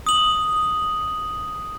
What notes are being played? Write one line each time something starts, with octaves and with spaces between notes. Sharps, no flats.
D#6 F#7